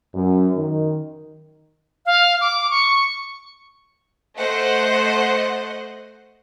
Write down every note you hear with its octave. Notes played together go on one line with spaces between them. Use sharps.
F#2
D#3
F5
D6
C#6
A3 C5 D#5 F#5